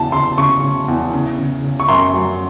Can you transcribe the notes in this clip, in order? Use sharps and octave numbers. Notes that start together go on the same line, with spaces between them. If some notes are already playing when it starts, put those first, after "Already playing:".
Already playing: E2 C#3 A5
C#3 C6
C#3 C#6
C#3
E2
C#3
C#3
C#3
C#6
F#2 C6
F#3